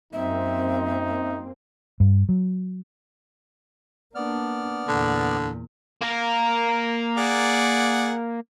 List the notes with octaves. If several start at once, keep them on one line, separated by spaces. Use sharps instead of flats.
F#2 A#3 C4 D#4 E5
G2
F#3
A#3 B3 D4 D5 F6
E2 A#2 D3
A#3 A#4
G#4 D5 F#5